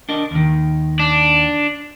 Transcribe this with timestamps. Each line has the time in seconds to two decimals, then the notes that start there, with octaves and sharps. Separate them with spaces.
0.09 D4 A#4 D#5
0.31 D#2 D#3
0.99 D4